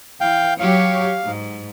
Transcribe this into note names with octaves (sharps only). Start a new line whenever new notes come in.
E3 F5 G5
F#3 G4 C#5 F5
G#2